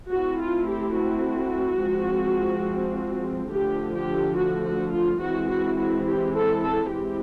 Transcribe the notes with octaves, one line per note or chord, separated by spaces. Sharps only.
A3 C4 E4 F#4
F4
G4
F#4
F3 G#3 C4
D3 F3 A3 G4
G4
F#4
F#4
F4
E3 G#3 C4 E4 F#4
F#4
F#4
G4
A4
A4
E3 G#3 C4 E4 G4